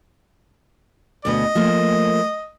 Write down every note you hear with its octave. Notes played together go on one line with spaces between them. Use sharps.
D2 B2 B4 D#5
F3 A3 A#3